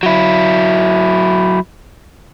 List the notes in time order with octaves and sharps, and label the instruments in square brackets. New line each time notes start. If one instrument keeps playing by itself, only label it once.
[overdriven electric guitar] F#3 E4